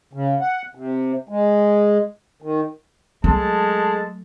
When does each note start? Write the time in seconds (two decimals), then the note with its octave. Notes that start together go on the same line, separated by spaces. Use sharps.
0.13 C#3
0.41 F#5
0.75 C3
1.29 G#3
2.42 D#3
3.24 F#3 G#3 A3 A4 A5